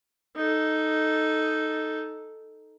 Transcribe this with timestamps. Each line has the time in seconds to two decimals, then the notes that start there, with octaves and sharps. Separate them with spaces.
0.36 D#4 A4